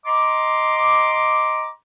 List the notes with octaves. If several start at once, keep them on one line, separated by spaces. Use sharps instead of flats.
D#5 A#5 C6 D6